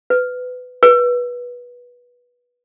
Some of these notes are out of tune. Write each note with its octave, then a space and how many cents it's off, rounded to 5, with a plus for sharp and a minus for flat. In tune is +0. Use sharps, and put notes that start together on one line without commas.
B4 +20
B4 -20